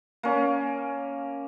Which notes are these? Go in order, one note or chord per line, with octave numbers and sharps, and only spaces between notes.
A#3 C#4